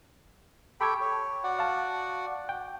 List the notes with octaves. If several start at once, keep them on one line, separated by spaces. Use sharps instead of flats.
G4 A4 G5 B5 C#6 G#6
C#5
F#4 D5 F#5
F5 A5
G5